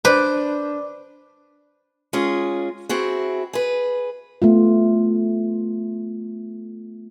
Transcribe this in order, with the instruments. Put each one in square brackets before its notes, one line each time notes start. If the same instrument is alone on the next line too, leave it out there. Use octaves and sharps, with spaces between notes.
[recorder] D4 [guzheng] B4 [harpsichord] C5 [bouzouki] D5
[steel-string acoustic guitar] G#3 C#4 F4 G#4
C4 E4 F#4 G#4
G#4 B4
[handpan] A3 B3 F4